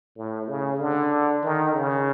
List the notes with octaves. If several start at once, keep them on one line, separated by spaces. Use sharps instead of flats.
A2
C#3
D3
D#3
C#3